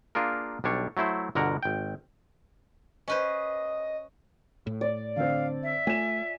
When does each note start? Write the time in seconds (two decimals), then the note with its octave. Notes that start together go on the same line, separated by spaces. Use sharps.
0.15 A#3 D4 F4 G#4 A#4
0.64 B1 G3 D4 C#5
0.97 F#3 A3 E4 C5
1.35 G1 B2 D3 A#4 F#5 A#5
1.63 G#1 G5
3.08 C#4 B4 C5 D#5
4.67 A2
4.81 D5
5.16 D3 C4 F5
5.63 E5
5.87 A3 F4 G#5 E7